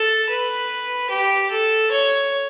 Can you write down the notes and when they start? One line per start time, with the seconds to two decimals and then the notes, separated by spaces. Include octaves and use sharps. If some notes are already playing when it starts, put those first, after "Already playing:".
Already playing: A4
0.29 B4
1.10 G4
1.51 A4
1.91 C#5